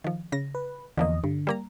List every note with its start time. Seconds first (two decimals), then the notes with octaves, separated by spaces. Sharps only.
0.04 D#3 F3
0.32 C#3 A#6
0.55 B4
0.97 E2 D3 F3 A#3 D#5
1.24 G2 D3
1.47 G3 A#3 A#5